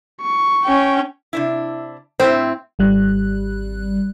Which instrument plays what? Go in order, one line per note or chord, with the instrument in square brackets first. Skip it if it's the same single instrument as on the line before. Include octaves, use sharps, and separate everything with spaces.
[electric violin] C#6
[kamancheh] C#4 G5
[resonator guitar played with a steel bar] C3 D4 E4
[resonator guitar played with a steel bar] A2 E4 [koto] C4 [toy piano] C5 G5
[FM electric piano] G#1 G3 F#6